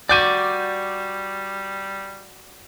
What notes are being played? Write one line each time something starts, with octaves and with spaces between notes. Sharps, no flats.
G3 F#4 D5 D6 G6 D#7